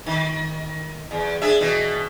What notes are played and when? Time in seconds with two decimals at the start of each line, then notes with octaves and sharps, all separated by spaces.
0.06 D#3
1.11 E2
1.42 D4 G#4 E5
1.61 B2 E3